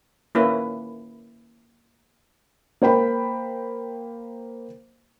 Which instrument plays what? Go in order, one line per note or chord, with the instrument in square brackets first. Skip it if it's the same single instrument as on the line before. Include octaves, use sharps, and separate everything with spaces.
[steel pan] A#3 C#4 E4 B4
[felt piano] A#3 C5 G5 B5